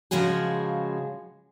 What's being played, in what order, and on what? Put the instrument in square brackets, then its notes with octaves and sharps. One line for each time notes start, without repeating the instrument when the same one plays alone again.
[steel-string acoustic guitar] C#3 F3 G#3 F#4 G#4